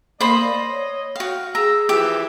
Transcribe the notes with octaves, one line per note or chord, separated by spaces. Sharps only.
A#3 C5 D#5 B5 C6
D5
C#5
F#4 F5 G5
G#4 A#5 E6
E3 F3 G4 E5